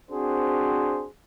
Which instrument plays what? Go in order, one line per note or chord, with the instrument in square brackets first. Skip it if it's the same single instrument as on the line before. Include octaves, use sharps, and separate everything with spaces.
[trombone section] C4 D4 F#4 G#4 C5